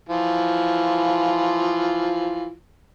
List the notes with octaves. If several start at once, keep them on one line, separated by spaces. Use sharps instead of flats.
E3 F3 F4